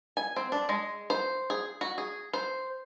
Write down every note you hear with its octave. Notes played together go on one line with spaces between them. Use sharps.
G#5
C4
D4
G#3
C5
G#4
F#4
G#4
C5